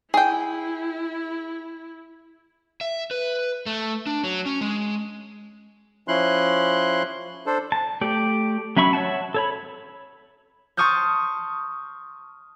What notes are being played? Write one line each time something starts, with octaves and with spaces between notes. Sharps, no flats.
E4 G#4 G5
E5
B4
A3
D4
F#3
C#4
G#3
F3 C#4 E4 C6 F#6
D4 A4 C5
A5
A3 G4 D5
F#3 C#4 E5 B5 C#6
C#5 E5 F#5 A5
A4 C#5 B5
A5 C6 C#6 D#6 F6 G6